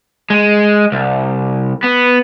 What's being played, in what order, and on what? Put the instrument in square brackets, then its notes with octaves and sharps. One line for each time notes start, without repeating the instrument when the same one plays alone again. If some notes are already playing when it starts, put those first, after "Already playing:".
[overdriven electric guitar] G#3
C2
B3